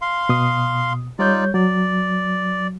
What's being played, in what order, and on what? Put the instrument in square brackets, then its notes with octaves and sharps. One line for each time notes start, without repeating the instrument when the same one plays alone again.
[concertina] F5 C6
[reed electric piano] B2 D#6
[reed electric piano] G3 C#5 G6 [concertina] D#4 F4 D5
[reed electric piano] F#3 [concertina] D5